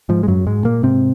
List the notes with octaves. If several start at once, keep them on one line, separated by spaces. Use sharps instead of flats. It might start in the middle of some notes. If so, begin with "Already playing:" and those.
G#2 F3
G#3
F#2 F#3
G#2 G#3
A#2 A#3
G#2 C3 C4